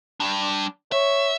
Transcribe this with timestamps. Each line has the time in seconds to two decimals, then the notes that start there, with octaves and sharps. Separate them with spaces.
0.20 G3 D4
0.92 C#5 E5